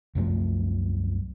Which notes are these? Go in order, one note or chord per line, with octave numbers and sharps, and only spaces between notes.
C2 F#2 F3 A3